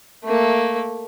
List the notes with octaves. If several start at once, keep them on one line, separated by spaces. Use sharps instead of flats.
A3 A#3